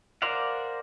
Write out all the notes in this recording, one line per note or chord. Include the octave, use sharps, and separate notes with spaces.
A#4 C5 D5 F5 F#5